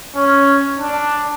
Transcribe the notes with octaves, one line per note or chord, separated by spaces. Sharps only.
C#4
D4